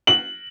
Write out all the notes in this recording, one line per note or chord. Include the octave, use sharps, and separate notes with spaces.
F#7